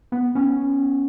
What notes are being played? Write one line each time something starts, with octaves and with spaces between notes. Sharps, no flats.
B3
B3 C#4